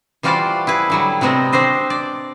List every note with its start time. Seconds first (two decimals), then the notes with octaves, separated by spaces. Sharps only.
0.23 E3 G3 F4 F#4 C5 D5
0.67 E4 G#4 B4
0.90 D3 F#3 G3
1.21 C3 F#3 B3 C4 D#5
1.52 C4 D4 C5 D#5
1.90 D5